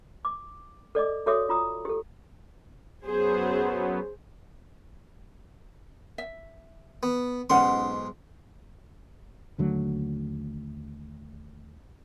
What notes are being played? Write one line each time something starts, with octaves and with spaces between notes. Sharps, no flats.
D6
A4 D5 D#5 D6
F#4 A4 C#5 E5 D6 D#6
F4 A#5 D#6
G4 A4
F#2 F#3 B3 G#4 C5
E5
B3
B1 G#2 C#4 F#5 C6
D#2 D3 F#3 A3